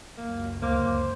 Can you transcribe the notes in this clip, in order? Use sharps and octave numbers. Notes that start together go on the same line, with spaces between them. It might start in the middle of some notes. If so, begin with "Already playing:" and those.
C#2 F#2 A#3
D2 A#3 C5 D6